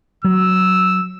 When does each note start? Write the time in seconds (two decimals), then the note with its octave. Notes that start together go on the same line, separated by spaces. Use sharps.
0.24 F#3 E6